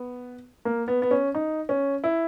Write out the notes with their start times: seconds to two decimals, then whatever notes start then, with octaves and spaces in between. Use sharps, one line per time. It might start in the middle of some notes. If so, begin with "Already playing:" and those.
Already playing: B3
0.65 A#3
0.88 B3
1.02 B3
1.11 C#4
1.35 D#4
1.69 C#4
2.04 E4